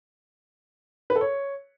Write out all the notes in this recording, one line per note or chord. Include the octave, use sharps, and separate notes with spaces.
B4
A4
C#5